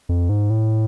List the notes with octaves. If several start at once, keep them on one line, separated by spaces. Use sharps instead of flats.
F2
G#2
A2